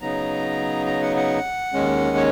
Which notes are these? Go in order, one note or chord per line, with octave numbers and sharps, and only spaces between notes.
C#3 F#3 B3 D#4 A#5
A#5
F#5
F#5
D#2 D#3 G#3 C#4
C#5